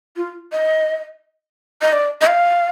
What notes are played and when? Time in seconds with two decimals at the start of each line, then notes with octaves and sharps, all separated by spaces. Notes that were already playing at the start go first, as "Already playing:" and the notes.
0.16 F4
0.52 D#5
1.81 D#5
1.92 D5
2.21 D#5
2.27 F5